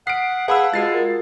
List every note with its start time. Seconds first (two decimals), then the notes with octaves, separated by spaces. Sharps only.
0.07 F#5 D#6 F6 B6 C7 D7
0.48 G#4 B4 F5 F#5 A5 B5 E6
0.74 G#3 F4 F#4 A6 C7
0.94 A#4